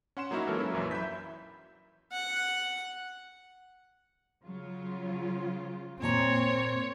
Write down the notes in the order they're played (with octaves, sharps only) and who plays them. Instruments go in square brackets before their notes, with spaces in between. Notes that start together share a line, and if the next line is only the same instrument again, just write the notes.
[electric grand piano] C#4 F#5 C6 E7
F#3 A#3 D#4 E4 F#4
E3 F#3 G#3 A#3 A4 A#4
A#3 C#4 E4
A#1 F#2 E3 F#3
E5 B5 G6 B6
[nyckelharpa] F#5
[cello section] C#3 F#3 F4
[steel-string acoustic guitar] A#2 A#3 A#5 [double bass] C4 [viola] C#5